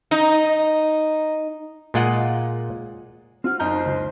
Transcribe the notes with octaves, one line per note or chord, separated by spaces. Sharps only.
D#4
A#2 G#3 F4 D#5 F#5
C4 F4 F#4 F6
F#1 D#4 C5 A#5 G6
C#2